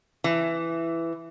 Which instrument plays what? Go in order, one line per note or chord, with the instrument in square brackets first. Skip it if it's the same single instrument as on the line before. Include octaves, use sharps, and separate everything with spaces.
[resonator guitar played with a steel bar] E3